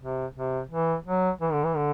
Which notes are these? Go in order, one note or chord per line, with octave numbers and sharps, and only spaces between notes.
C3
C3
E3
F#3
E3
D3
E3
D3